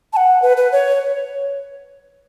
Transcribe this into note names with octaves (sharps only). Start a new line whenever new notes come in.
A5
F#5
B4
B4
C#5